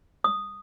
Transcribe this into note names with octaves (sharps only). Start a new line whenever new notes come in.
D#6